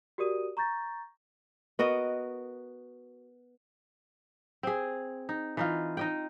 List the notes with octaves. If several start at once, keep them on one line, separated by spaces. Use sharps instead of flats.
F#4 G4 A#4 D5 D#6 D#7
A#5 C#6 G6 A6 A#6
B3 F#4 A#4 D#5
C4 G#4
D#4
E3 D#4 F4
D#4 D#5 G5